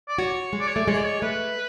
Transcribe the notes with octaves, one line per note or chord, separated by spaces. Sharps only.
D5
F#4 C#5
G#3
D5
C#5
A3 D5
G#3 C#5
D5
C#5
A3 B4